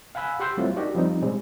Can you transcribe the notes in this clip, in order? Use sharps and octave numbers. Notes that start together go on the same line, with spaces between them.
F5 F#5 G#5 B5 E6 F#6
G4 F#5 C6 E6 G6
F#3 G3 A3 C4 E4 F4
D4 D#4 F#4 G4 A#4 D5
F3 G3 C4 D#4
B2 G3 G#3 C4